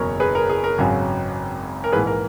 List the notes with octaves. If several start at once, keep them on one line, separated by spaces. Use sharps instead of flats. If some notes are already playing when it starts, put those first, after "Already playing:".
Already playing: F#1 E2 B2 F#3 A#4 C#5
G#4 B4
A#4
G#4
A#4
G#1 F#2 C#3 F#3
A#4
A#1 G#2 E3 G#4 B4
A#4